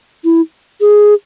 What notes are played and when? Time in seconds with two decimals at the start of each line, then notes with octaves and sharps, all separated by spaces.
0.24 E4
0.81 G#4